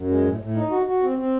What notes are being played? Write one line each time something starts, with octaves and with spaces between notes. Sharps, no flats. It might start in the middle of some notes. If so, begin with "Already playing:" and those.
Already playing: F#2
G#3
A2
A2
D#4
F#4
F#4
C4
C4